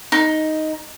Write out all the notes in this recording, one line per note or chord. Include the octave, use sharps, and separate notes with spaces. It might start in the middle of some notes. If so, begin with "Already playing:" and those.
D#4